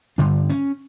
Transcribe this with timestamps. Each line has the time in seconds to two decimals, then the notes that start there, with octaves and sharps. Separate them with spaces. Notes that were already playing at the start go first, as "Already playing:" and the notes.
0.18 G2 D3 D4
0.49 C#4